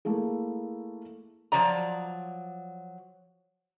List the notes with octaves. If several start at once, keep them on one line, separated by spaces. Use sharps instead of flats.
A3 A#3 E4 G#4
F3 F#3 D5 A#5